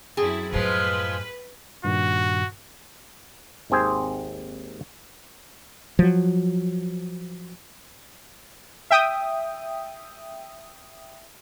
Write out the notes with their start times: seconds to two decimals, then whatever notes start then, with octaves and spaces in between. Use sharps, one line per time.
0.17 F#2 C4 E4 G#4 A4
0.53 F#2 A2 F3 G#3 B4
1.84 G2 A#2 D#3 F#4
3.70 G#1 D#2 C4 G#4 C5
5.99 F3 F#3
8.91 E5 G5 D#6